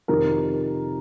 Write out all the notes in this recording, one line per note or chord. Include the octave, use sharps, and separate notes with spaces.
F2 C3 D#3 A#4